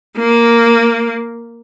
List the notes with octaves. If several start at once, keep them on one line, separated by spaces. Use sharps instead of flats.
A#3